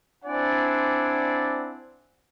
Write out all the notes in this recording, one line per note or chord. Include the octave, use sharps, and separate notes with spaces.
C4 D4 E4 D5 F#5 G#5